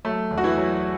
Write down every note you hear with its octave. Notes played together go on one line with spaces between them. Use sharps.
F#3 A3
E2
F#4
E3 E4
F#3